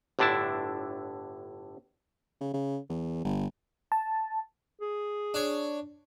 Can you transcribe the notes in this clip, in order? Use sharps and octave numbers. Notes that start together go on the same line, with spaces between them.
G1 A2 D3 D4 E4 A5
C#3
C#3
E2
G1
A5
G#4
D4 C#5